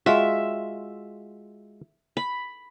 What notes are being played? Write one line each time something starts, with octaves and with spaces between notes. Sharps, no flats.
G#3 F4 F#4 E5
B5